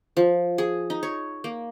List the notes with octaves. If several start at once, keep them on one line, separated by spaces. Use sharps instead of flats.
F3
G#4
D#4
C#5
A#3